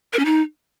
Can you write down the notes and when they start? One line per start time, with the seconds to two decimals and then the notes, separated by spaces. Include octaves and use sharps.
0.13 A#4
0.19 C#4
0.25 D#4